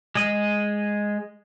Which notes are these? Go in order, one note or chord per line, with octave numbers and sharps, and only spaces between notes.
G#3 G#4 D#5